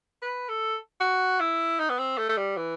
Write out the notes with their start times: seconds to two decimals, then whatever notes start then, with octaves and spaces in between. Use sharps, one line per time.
0.22 B4
0.49 A4
1.01 F#4
1.40 E4
1.79 D#4
1.89 B3
1.99 C4
2.18 A3
2.29 A3
2.37 G3
2.57 E3